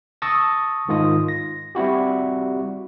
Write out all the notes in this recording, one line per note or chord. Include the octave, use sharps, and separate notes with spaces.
A5 C#6 D#6 E6 A6 A#6
G#2 D#3 F4 D#5 D#6
A#6
G3 C4 E4 F#4 G4